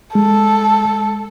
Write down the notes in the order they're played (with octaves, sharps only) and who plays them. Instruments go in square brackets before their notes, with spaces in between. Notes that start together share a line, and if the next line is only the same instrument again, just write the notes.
[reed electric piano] G#3 [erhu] A4